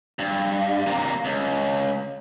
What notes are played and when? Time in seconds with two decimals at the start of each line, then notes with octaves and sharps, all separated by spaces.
0.19 G2
0.87 C3 A#3
1.25 C#2